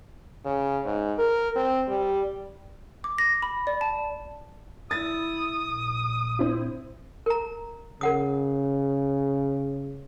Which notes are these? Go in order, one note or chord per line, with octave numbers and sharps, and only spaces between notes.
C#3
G#2
A#4
C4
G3
D6
A#6
B5
D5
A5
E4 D#6 A6
A#1 A#2
C4 E4
A#4 A#5
C#3 A#4 F#5 D#6